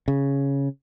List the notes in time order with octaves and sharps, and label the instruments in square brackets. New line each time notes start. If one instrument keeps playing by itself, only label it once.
[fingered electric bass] C#3